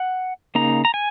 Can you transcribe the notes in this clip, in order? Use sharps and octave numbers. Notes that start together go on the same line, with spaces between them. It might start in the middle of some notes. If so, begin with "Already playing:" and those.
Already playing: F#5
C#3 A#3 D#4 A#5
A#5
G#5